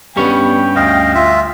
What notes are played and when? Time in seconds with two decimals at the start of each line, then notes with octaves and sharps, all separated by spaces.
0.16 G2 G3 B3 C#4 C#5 G5
0.76 D2 D#5 F5
1.15 F4 E5